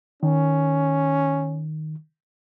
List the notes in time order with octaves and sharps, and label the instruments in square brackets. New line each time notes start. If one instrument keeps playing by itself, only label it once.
[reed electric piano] D#3 [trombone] C#4